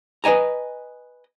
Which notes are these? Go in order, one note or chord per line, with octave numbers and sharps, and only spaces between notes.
B4 C5 D#5 G#5 A#5